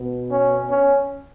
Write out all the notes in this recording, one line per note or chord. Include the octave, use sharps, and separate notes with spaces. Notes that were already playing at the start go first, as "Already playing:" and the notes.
Already playing: B2 B3
C#4
C#4